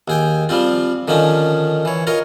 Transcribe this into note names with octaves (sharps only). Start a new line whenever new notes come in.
D#2 G#4 G5
F3 G3 C4 F4
D3 D#3 F3 C#4 D#4
E3 C#5
F4 A#4 C#5 D#5